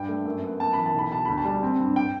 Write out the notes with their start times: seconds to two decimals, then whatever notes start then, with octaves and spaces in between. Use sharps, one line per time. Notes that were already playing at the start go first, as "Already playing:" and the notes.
Already playing: G2 G5
0.09 A3
0.25 F#2
0.43 B3
0.60 F#2 A5
0.73 E3 B5
0.86 A5
0.94 B1 B5
1.11 B2 A5
1.25 D2 B5
1.38 A5
1.45 G3
1.63 C4
1.80 G2
1.96 G5